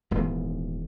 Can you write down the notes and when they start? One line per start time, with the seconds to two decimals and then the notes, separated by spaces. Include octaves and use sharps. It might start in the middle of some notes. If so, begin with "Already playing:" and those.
0.11 D#1 G#2 E3 B3